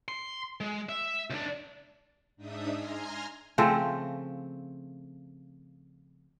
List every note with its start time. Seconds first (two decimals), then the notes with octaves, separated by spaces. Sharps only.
0.08 C6
0.60 G#3
0.89 E5
1.30 C#2 D4
2.37 G#2 D4 D#4 E5 D#6
2.74 G#5 A#5 C6 F6
3.58 C#3 F3 A3 C4